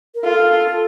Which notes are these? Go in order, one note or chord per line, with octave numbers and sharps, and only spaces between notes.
A#4
F4 A4